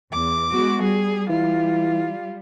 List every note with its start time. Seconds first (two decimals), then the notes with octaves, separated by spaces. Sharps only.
0.12 E2 D6
0.51 G#3 B3 F#4
0.82 G3 G#4
1.29 E3 F4